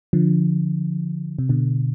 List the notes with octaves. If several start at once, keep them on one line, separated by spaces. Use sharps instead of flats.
D3 F3
C3
B2 D3